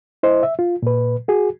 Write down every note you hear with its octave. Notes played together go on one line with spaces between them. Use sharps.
E4 C5 D#5
E5
F4
A#2 B4
F#4 G#4